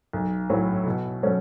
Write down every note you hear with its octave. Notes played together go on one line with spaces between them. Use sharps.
B1
A2 F#3
B2
F#3 A3 C#4